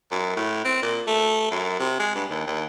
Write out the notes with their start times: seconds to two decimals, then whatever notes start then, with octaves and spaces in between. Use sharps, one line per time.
0.11 F#2
0.37 A2
0.65 C4
0.83 A#2
1.07 A3
1.51 F#2
1.80 C3
1.99 G#3
2.15 G2
2.30 D#2
2.46 D#2